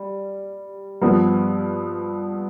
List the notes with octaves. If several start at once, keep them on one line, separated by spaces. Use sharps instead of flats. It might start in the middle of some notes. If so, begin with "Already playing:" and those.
Already playing: G3
G2 F3 B3